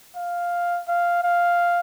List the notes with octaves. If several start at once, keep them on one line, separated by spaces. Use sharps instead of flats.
F5
F5
F5